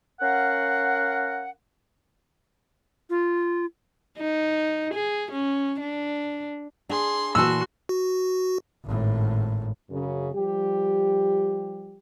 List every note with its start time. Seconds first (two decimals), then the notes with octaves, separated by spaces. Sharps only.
0.20 C#4 A#4 F5 F#5
3.10 F4
4.18 D#4
4.93 G#4
5.31 C#4
5.80 D4
6.89 D4 G#4 C6
7.35 A#2 E3 F#4 A5 C6 E6
7.89 F#4
8.85 G#1 A2
9.89 F#2 C#3
10.33 F3 G3 G4